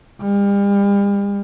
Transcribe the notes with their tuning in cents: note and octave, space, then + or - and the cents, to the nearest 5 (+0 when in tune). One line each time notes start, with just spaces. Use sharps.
G3 +40